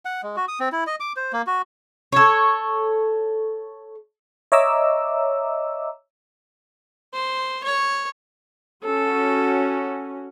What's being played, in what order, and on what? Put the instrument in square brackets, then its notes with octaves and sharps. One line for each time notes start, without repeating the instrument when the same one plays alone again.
[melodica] F#5
G#3
F#4
D#6
C4
E4
D#5
D6
C5
A#3
F#4
[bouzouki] A4 C#5
[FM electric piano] C#5 D#5 E5 A#5 D6 E6
[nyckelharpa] C5
C#5
[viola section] C#4 F#4 [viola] A4